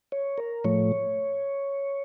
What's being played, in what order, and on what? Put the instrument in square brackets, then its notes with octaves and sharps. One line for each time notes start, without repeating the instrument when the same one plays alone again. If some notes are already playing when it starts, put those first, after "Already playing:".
[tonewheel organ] C#5
A#4
A2 F3 A3 C#5